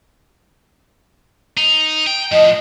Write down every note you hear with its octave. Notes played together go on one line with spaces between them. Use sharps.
D#4
G5
A2 F3 D#5